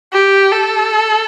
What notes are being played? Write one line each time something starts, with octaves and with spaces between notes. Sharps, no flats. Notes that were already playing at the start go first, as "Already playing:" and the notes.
G4
A4